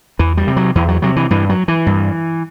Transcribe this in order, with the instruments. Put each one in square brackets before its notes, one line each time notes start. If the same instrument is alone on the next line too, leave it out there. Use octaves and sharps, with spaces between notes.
[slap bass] E2 E3
G3
C3
F#3
E2 E3
F#3
C3 F#3
E3
G2 E3
F#3
E3
G2